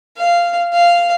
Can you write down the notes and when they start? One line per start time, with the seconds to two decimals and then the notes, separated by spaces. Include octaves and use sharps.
0.17 F5
0.73 F5